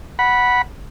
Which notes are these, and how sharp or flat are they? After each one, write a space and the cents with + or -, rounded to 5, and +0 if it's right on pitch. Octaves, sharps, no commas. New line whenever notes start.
F#5 +0 B5 -10